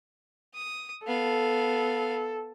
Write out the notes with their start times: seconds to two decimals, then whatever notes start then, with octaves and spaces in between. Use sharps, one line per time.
0.55 D#6
1.07 B3 A4 F5